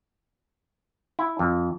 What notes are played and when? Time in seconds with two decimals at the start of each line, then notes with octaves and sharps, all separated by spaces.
1.19 E4
1.39 F2